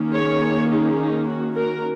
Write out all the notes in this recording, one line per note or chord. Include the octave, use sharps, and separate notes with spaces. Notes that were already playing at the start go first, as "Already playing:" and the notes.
Already playing: D#3 A#3 C#4
G#4 C#5
D#4 G#4
D#4
F#4
F#4 A#4